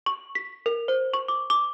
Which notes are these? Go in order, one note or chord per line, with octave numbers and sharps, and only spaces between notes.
C#6
B6
A#4
C5
C#6
D6
D6